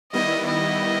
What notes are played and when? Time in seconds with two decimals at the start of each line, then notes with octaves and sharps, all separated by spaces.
0.12 D#3 G3 B3 E4 D#5
0.47 D#5